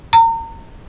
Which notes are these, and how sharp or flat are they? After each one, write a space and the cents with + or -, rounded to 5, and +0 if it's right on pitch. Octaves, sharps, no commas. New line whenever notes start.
A#5 -35